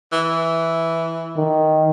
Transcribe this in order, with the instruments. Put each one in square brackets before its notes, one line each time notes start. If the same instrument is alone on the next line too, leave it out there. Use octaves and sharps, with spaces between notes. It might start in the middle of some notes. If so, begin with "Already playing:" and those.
[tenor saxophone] E3
[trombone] D#3